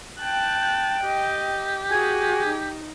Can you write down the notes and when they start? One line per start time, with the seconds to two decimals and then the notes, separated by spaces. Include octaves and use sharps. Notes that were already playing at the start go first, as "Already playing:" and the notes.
0.21 G5 A5 F#6
1.04 G4 D#5
1.91 F#4 G#4 G#5
2.48 D#4